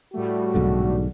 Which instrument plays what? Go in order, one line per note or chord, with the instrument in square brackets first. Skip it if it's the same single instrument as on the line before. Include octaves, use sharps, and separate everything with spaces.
[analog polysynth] A2 G3 A3 [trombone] F#4
[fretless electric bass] B1 G#2 D3